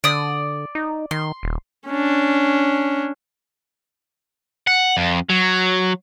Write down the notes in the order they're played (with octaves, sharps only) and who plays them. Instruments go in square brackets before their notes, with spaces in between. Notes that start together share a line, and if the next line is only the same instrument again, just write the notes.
[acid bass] D3 [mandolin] D5 D#6
[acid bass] D#4
[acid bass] D#3 [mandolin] C6
[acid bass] D#1
[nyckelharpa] C#4 D4
[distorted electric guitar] F#5
F2
F#3